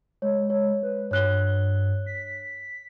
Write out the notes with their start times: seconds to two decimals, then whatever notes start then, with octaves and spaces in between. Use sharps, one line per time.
0.22 G#3 C#5
0.50 C#5
0.83 B4
1.11 G2 C#5 F#6 G7
2.06 B6